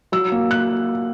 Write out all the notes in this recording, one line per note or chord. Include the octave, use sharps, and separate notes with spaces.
F#3 E6
A#3
F#6